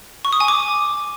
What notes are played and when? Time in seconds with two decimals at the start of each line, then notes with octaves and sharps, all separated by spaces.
0.25 C#6
0.33 D#6
0.40 G#5
0.48 D6